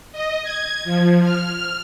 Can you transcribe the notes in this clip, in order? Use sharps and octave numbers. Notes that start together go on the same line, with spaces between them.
D#5
G#6
F3
F6